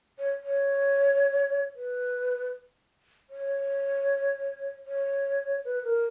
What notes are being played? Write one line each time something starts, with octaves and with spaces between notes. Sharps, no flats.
C#5
C#5
B4
C#5
C#5
B4
A#4